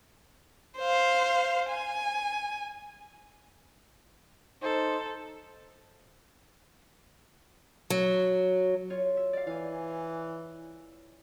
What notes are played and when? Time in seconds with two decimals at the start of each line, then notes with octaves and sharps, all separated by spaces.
0.78 C5 F5
1.70 G#5
4.63 D#4 A4 C5
7.90 F#3
8.90 F4 C#5
9.17 E5
9.33 D5 F5
9.47 E3 F5 G#5